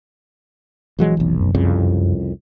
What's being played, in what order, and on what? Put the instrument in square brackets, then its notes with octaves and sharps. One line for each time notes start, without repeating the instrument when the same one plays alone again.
[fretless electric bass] A#1 F#3 G#3 [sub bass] E3
[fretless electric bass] F1 B1
[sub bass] F#2
[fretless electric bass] C2 F2 C#3